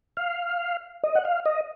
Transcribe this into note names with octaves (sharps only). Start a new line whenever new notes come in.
F5
D#5
F#5
F5
D#5